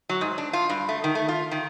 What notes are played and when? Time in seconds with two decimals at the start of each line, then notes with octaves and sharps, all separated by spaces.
0.09 F#3
0.21 G#2
0.38 D4
0.53 F4
0.69 G2
0.89 A3
1.04 D#3
1.15 A3
1.29 F4
1.51 D#3